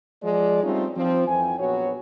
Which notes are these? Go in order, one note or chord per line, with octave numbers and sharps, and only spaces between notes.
F3 G#3 D5
G3 A3 C4 C#4 D#4 F4
F3 C4
F2 E3 G5 G#5
A#1 F#3 B3 F#4 C#5